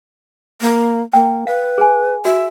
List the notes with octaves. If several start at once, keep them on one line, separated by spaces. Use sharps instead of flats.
A#3
A#3 G5
B4 F5
G#4 G#5
F#4 E5